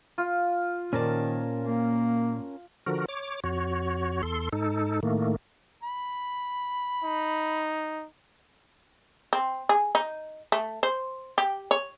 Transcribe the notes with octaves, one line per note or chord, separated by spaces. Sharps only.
F4
A#2 D#3 C#4 A#4 C5 D5 A5
A#3
D3 F3 F#4 A#4
C#5 D6
F2 F#4 C#5
E2 A4 C6
G#2 D#4 A4
A2 D#3 A3 A#3
B5
D#4
C4
G#4
D#4
A3
C5
G4
C#5